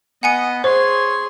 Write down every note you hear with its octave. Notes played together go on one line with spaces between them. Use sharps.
B3 D#5 F#5 G#5 C#7
G#4 C5 C#5 C6